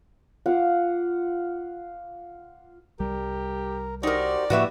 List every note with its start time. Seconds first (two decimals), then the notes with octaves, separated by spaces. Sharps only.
0.46 F4 F5 F#5 D6
3.00 C2 G3 G4 A#4
4.03 D#4 F#4 G4 A#4 C5 D5
4.50 A2 F3 A#3 E4 F#4 G4 B4 E5